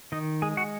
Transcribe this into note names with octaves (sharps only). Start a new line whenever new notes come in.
D#3 D#4 D#5
G#3 G#4 G#5
F#4 F#5